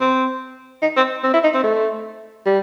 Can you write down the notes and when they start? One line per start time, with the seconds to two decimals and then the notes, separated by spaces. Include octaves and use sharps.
0.01 C4
0.82 D#4
0.97 C4
1.24 C4
1.34 E4
1.44 D#4
1.55 C4
1.64 A3
2.46 G3